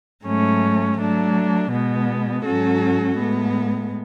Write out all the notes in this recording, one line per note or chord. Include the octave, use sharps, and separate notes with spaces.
G#2 F#3 A3 C#4
F#3 A3 D4
B2 G#3 B3
G#2 F#3 C#4 F#4 A4
A2 G#3 B3